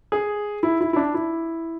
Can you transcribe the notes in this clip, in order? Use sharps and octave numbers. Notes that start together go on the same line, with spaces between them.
G#4
E4
E4
E4
D4
E4